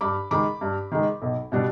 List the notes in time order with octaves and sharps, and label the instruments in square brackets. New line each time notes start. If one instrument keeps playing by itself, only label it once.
[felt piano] G2 B5 D6
D#3 G#3 B5 D6
G2
D#3 G#3
B1
B2 G3 D4